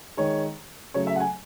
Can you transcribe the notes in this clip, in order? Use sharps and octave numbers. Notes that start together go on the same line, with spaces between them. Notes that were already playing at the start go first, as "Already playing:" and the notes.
D#3 G#3 C#5
C#3 F#3 A3 C#5
E5
F#5
G#5